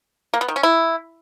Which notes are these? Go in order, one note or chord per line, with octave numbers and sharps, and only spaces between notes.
A#3
B3
D#3
C#4
E4